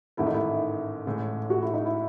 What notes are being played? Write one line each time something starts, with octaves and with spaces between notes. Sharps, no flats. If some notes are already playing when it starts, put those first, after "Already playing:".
A1 G#2 D#3 A3 E4
D#4
E4
A1 A2 G#3
F#4
E4
D#4
E4